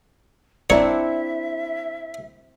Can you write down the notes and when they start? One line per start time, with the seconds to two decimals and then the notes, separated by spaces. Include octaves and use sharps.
0.70 C4 D4 E4 C#5 D5 E5 A#5